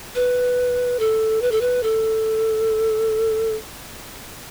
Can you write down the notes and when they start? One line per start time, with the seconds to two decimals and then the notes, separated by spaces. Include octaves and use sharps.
0.15 B4
0.99 A4
1.42 B4
1.51 A4
1.61 B4
1.83 A4